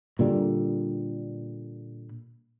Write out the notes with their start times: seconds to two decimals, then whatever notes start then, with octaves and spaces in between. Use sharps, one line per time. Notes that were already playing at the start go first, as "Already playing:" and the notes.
0.19 A#2 D3 G3